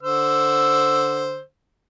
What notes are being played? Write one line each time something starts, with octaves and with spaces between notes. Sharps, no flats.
D3 C5 E6